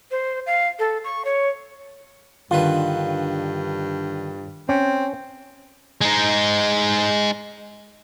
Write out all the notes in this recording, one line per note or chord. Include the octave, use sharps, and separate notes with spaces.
C5
F5
A4
C#6
C#5
G2 D3 D#3 F4 B4
C4 C#4
G#3 D#4